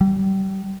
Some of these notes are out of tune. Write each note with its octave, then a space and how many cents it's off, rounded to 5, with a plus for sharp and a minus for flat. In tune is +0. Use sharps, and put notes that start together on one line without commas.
G3 -30